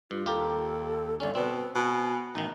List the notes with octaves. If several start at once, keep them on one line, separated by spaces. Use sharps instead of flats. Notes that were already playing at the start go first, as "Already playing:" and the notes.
G2 F4
D#2 F4 G4 A4 A#4
G1 C#4 D5
B2 C4 B4
B2 G#5
A1 D#3 D#4